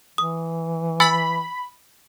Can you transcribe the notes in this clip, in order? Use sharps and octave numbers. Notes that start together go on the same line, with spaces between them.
E3 D#6
G#5 B5 E6 A6